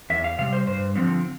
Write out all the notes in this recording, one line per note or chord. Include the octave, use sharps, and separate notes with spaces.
E2 E5
F5
C3 G3 F5
C5
G2 C5
D3 F3 C4